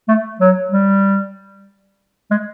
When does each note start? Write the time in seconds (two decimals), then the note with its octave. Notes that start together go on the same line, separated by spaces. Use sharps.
0.09 A3
0.41 F#3
0.72 G3
2.31 G#3